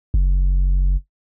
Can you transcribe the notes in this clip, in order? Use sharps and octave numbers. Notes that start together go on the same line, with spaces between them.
F#1